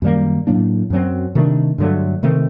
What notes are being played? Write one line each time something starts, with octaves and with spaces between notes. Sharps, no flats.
F#2 D#3 G3 A#3
A2 F#3 A#3 D4
F#2 F#3 C4
C3 D#3 A3 D4
G2 D3 F#3 A3
C3 D#3 A3 C4